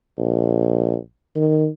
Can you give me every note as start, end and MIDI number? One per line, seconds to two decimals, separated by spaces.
0.18 0.97 34
1.36 1.67 51